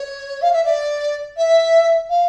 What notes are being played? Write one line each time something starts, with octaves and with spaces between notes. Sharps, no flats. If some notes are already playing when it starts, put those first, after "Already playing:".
Already playing: C#5
F5
E5
D5
E5
F5